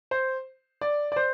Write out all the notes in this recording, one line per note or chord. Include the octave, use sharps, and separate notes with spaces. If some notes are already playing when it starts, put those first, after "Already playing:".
C5
D5
D5
C5